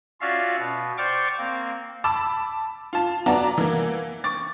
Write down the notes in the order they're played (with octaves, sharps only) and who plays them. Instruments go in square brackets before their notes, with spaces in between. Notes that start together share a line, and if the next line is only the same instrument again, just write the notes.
[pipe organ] C#4 F4 F#4 D5 E5 F5
B2
C5 D5 G5 C#6 D6 F6
A#3 C4
[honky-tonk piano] A5 B5 D6 E6
F4 A5
F#3 B3 F#4 D5 A5 A#5
E3 A#3
C#6 D6 A6